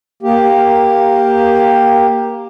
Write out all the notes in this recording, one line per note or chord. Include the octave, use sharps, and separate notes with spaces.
A#3 G4